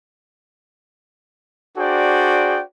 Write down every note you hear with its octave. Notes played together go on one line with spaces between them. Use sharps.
D4 F#4 G#4 C5 D5 G5